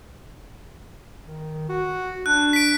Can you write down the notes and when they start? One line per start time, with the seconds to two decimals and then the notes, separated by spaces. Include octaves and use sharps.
1.27 D#3
1.69 F#4
2.26 D4 F#6
2.53 B6 D7